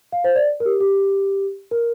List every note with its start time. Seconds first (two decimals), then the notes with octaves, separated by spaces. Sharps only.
0.12 F5
0.24 C5
0.36 D5
0.60 A#4
0.65 G4
0.80 G4
1.71 A#4